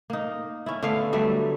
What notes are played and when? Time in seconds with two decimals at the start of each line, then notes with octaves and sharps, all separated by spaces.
0.10 A#3 D#4
0.66 C#4 E4
0.83 D3 A3 B3 F5
1.13 F#3 G3 A3 E5